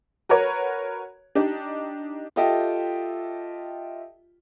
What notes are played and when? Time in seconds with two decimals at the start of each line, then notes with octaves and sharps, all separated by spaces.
0.29 F#4 A#4 B4 C#5
1.35 D4 D#4 G4
2.36 F4 G4 A4 D#5 E5 G5